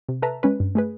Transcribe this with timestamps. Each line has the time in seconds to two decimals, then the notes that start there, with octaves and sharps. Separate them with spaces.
0.09 C3
0.22 A4 B4 E5 A5 A#5
0.43 G#3 C#4 B4
0.60 G2
0.75 A3 G#4 B4